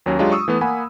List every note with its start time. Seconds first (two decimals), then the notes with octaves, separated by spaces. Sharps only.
0.06 D#2 F#3 C#4
0.19 F#3 G#3 D4 F4 G4
0.32 C#6 D#6 E6
0.48 E3 A3 B3
0.61 A#3 F#5 G#5 B5